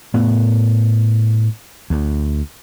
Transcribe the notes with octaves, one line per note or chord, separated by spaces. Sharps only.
A2 B3
D2